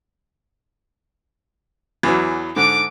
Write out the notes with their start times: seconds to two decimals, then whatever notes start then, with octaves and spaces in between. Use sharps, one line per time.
2.03 E2 E3 F#3
2.56 G#2 D3 D6 D7